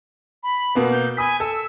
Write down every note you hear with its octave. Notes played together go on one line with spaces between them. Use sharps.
B5
B2 A#3 B3
G6
G#5 B5 D#6 B6
A4 E6